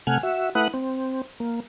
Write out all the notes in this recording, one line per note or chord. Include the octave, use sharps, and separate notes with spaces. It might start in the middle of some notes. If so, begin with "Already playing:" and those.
C3 A3 F#5 G#5 F6
F#4 E5
A3 E4 B4 F#5 D#6 F#6
C4
A#3